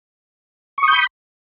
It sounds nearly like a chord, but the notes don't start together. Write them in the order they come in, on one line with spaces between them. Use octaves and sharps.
C#6 D#6 G6 B5